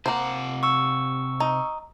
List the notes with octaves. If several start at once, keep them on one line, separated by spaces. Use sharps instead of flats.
C3 A#3 C5 F#5
C#6 E6
D#4